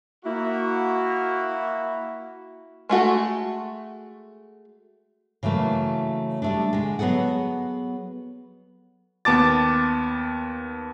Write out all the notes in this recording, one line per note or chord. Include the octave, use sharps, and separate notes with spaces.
A#3 E4 F#4
G#3 A3 F#4 A4
C#3 E3 F#3 A3 A#3
G3 A3 D4
D3 G#3
F#3 B3 G#4 A4 F#5
D#2 B3 A5 D6 A6